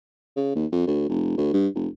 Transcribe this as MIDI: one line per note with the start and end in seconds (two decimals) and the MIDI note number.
0.36 0.52 49
0.55 0.66 39
0.72 0.82 41
0.87 1.08 38
1.09 1.35 29
1.37 1.50 38
1.53 1.68 43
1.75 1.87 29